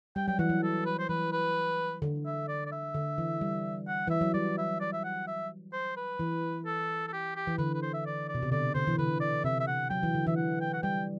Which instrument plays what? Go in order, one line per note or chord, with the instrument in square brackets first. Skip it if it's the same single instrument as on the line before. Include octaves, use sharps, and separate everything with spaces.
[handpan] G3 [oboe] G5
[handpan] F#3 [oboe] G5
[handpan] E3 [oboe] F#5
[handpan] F#3
[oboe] A4
B4
C5
[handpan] E3 [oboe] B4
[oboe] B4
[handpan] D3
[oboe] E5
D5
D5
E5
[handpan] D3
E3
G3
[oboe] F#5
[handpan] E3 [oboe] E5
[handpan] F#3
[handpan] G3 [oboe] D5
[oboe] E5
D5
E5
F#5
E5
C5
B4
[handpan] E3
[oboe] A4
A4
G4
G4
[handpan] E3
[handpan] D3 [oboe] B4
[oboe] B4
C5
E5
D5
D5
[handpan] B2
C3
[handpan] D3 [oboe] D5
[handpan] D3 [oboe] C5
[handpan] E3
[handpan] D3 [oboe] B4
[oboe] D5
[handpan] C3 [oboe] E5
[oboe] E5
F#5
[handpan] F#3 [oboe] G5
[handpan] E3
D3
[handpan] E3 [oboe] E5
[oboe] F#5
G5
F#5
[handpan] G3 [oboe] G5